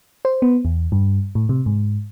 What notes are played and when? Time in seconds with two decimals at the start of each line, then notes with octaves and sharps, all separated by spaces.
0.25 C5
0.42 B3
0.65 E2
0.92 G2
1.35 A2
1.49 C3
1.66 G#2